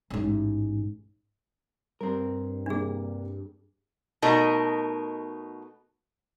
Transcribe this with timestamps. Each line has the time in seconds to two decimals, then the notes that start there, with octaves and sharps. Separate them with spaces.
0.10 A1 G#2
2.01 G2 C4 A#4
2.66 C3 G3 A#3 D4 G#4
4.22 B2 A3 D#4 A#4